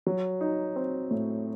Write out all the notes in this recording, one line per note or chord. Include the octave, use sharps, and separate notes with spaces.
F#3
D#4
C4
A2